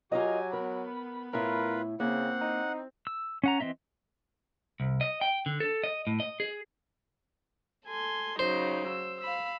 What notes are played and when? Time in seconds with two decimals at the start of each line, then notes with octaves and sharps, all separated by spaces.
0.12 F#3 F4 G4 A#4 D#5 G#5
0.53 B3 A#4 B5
1.33 A2 A3 E4 F4 A#4 B4
2.00 C#3 A#3 C4 F#5
2.41 D#4
3.07 E6
3.44 C#4 F#5 A#5
3.60 E3 C4 D#5 E5
4.80 C2
5.01 D#5
5.21 G5
5.46 D3
5.60 A4
5.84 D#5
6.07 A2
6.20 D#5
6.40 G#4
7.86 A4 G#5 C6
8.39 C#3 F#3 D#4 C5
8.88 E6
9.21 F5 B5 E6